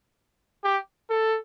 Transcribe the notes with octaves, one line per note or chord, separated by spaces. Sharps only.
G4
A4